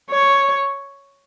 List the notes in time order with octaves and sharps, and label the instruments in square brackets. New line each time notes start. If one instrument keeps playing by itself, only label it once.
[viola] C#5